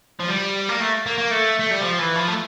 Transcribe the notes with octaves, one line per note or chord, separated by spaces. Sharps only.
F3
G3
A#3
A3
A#3
A#3
A3
A3
G3
F3
E3
F3
A3